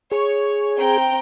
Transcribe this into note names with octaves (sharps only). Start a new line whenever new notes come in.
G#4 C#5
C4 G5 A#5